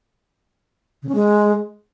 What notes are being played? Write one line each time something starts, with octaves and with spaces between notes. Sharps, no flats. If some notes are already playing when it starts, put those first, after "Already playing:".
C#3
C#4
G#3